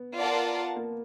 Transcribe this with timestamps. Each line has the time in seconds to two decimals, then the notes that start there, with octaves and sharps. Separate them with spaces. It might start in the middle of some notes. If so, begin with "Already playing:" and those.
Already playing: B3
0.18 F4 A#4 D5 F#5 A5
0.76 A#3